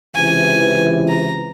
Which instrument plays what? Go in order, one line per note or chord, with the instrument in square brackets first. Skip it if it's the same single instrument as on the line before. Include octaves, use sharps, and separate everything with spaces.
[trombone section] C#2 C3 E3 [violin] G#5
[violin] A#5